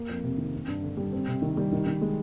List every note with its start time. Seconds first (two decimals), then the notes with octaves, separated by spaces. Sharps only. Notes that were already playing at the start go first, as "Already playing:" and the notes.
Already playing: A#3
0.09 F2
0.24 C3
0.38 D#3
0.53 C4
0.68 G2
0.83 D3
0.97 G3
1.13 C4
1.28 C3
1.42 D#3
1.57 G3
1.72 D#3
1.86 D#3
2.01 G#3